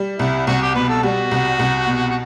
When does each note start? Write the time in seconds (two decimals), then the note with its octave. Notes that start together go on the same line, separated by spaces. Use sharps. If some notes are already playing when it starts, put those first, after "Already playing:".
Already playing: G3
0.19 C2 E4
0.47 C2 F#4
0.62 G4
0.75 B2 B4
0.89 A4
1.03 G3 F#4
1.31 C2
1.59 C2
1.87 B2
2.10 F#4